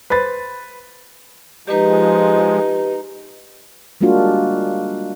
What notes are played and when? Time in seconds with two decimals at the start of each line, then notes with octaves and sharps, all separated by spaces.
0.10 B4 C5 B5 A6
1.67 F3 G#3 D#4 G4 B4
4.01 G3 G#3 A#3 D4 F4 F#4